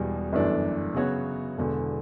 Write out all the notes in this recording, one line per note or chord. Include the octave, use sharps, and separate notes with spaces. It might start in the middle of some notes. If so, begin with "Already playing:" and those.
Already playing: E1 E2 B2 G3
G1 F#2 E3 A3 D4
C#3 F#3 B3 F#4 C#5
E1 E2 D3